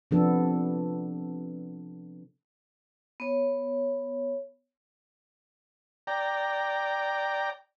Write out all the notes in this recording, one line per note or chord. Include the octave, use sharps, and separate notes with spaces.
C3 F3 B3 D4 A4
B3 C#5
D5 G5 A#5